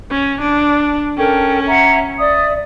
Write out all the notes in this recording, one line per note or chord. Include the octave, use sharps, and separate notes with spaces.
C#4
D4
C#4 A4 A#4 G5
E5 F#5 A#5
D5 E5 D#6